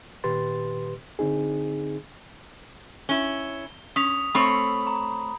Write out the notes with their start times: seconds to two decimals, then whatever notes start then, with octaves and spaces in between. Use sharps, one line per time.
0.24 A#2 D#3 G4 B4 C6 A6
1.19 D3 C4 D#4 G#4
3.09 C#4 E4 G7
3.96 C#4 D#6 B6 F7
4.35 A3 C4 C#5 B5 F#7
4.87 A#5